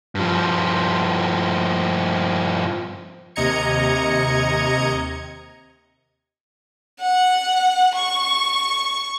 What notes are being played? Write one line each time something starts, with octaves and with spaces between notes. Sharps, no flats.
G2 F3
D#2 C3 D#5 A#5 G#6 C#7
F#5
C#6